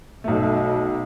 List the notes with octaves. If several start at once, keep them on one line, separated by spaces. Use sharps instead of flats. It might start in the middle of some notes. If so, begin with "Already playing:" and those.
B1 B2 A3